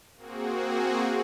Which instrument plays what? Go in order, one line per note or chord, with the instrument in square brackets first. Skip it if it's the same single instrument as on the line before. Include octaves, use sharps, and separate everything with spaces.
[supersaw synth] A#3 C4 F#4 G#4